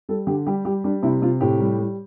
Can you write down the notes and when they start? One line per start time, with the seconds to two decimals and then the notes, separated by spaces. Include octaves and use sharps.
0.09 G3 A4
0.27 D3 G4
0.46 G3 G4
0.65 G3 G4
0.84 G3 D4
1.03 C3 E4
1.22 C3 F4
1.41 A2 G4
1.59 G3
1.79 G3